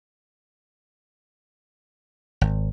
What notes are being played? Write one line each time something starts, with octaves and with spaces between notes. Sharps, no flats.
G#1